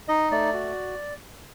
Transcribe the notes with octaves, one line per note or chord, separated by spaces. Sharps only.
D#4 D#5
A3 D5
F#4